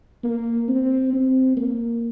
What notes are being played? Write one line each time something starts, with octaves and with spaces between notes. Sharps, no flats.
A#3
C4
C4
A#3